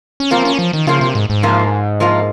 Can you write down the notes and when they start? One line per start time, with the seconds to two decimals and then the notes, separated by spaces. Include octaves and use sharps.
0.20 C#4
0.31 F3 A#3 C4 F4
0.45 C#4
0.59 F3
0.73 D#3
0.87 C#3 F3 A#3 F4
1.01 C3
1.15 G#2
1.30 G#2
1.43 F3 A#3 F4
2.00 F3 A#3 F4